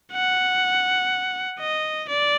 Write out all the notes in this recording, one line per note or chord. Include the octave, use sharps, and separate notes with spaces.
F#5
D#5
D5